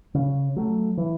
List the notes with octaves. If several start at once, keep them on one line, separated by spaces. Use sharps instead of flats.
C#3
F#3 A3
E3